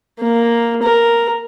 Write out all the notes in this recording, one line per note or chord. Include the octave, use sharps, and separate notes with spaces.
A#3
A#4